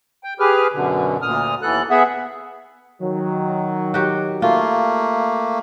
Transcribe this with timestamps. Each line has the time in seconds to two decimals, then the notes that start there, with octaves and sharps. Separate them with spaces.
0.24 G5
0.40 G4 G#4 B4 F6
0.73 F#2 B2 D3
1.22 D2 A#2 D#6 F6
1.62 D#2 E3 B3 A4 F#6
1.90 B3 G#4 E5 F#5
3.02 D#3 F#3
3.94 F#4 G4 C#5
4.42 A3 A#3 F4